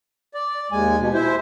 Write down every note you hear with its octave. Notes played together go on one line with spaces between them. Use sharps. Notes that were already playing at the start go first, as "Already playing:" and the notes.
D5
D#2 G#3 G#5
B2
E4 C5